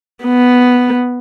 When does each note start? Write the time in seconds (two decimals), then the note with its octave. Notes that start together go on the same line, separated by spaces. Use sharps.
0.24 B3